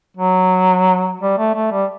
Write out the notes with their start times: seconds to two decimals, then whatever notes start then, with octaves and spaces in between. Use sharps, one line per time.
0.17 F#3
1.21 G3
1.38 A3
1.55 A3
1.72 G3